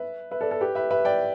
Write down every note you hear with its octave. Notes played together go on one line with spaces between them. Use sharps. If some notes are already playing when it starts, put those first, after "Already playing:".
Already playing: B4 E5
B4 E5
A4 D5
A4
G4 B4
B4 E5
B4 E5
D5 G5